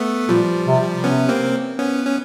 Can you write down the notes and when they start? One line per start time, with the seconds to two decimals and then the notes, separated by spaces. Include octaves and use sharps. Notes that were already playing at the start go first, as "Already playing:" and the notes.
Already playing: A3 B3
0.29 A#2 F3 G3
0.67 C3
1.04 C3 B3 C#4
1.29 A#3 C4
1.79 B3 C#4
2.06 C#4